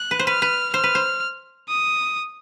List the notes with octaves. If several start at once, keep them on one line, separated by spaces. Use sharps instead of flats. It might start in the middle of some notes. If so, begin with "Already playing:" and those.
Already playing: F#6
B4
C5
B4 F6
B4
C5 F6
B4
C5
D#6